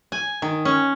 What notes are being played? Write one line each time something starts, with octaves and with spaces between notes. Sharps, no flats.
G#5
D#3
C#4